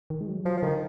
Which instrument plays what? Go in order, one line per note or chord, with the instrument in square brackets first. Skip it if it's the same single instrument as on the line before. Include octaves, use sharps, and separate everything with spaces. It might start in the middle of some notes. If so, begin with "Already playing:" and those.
[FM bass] D#3
G#3
F#3
[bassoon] F3 [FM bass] F#3
[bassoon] F3
[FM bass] D3 [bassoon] D#3